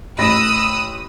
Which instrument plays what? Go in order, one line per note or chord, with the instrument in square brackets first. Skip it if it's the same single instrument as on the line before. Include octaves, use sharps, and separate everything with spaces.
[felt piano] A1 B5 A#6 [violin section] D#6 E6 F#6